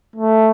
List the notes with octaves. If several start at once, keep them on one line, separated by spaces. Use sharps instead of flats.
A3